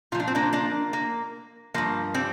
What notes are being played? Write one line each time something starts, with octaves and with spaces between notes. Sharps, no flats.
A#2 F3 F4
D4
C4
A#3 D4
A#3 D4
A#3
G2 F3 A#3
G3 C4